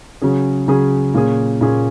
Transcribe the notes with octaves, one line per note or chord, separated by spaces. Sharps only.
C#3 F#3 C#4 G#4
C#3 F#3 C#4 G#4
A#2 A#3 C#4 G#4
A#2 A#3 C#4 G#4